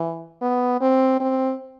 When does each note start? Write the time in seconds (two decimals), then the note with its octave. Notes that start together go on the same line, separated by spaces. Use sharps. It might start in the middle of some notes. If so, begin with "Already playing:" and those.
Already playing: E3
0.42 B3
0.81 C4
1.20 C4